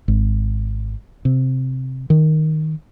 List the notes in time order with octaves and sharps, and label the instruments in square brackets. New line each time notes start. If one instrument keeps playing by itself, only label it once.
[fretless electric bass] G#1
C3
D#3